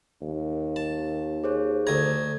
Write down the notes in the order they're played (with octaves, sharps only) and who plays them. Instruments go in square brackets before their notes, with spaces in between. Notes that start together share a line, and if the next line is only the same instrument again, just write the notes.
[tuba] D#2
[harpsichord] A5
[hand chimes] G#4 C5 C#5
[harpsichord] D2 A#5 [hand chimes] A4 G#6